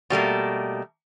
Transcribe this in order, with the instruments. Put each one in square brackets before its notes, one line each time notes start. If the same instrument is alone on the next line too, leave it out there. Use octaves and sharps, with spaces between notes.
[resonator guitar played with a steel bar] B2 G3 A3 A#3